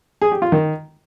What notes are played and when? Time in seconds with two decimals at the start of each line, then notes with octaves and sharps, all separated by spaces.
0.22 G#4
0.32 G4
0.42 F4
0.52 D#3